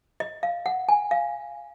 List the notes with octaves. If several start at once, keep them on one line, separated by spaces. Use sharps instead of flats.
D#5
F5
F#5
G#5
F5